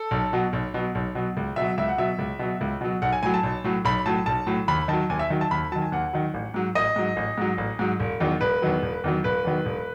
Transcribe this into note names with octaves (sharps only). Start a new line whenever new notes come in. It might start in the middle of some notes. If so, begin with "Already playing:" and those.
Already playing: A4
B1
B2 F#3
B1
B2 F#3
B1
B2 F#3
C#2
B2 E5
F#3
C#2 E5
F#5
B2 F#3 E5
C#2
B2 F#3
C#2
B2 F#3
B1 F#5
G#5
A2 F#3 G#5
A5
B1
A2 F#3
B1 B5
A2 F#3 A5
B1 A5
A2 F#3
D#2 B5
D#3 F#3 A5
D#2 G#5
E5
D#3 F#3
A5
D#2 B5
D#3 F#3 A5
G#5
D#2 F#5
D#3 F#3
A1
G#2 F#3
A1 D#5
G#2 F#3
A1
G#2 F#3
A1
G#2 F#3
E1
E2 D#3 F#3
E1 B4
E2 D#3 F#3
E1
E2 D#3 F#3
E1 B4
E2 D#3 F#3
E1